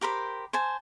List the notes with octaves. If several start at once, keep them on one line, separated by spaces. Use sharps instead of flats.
G4 A#4 C5 B5
C5 G#5 A5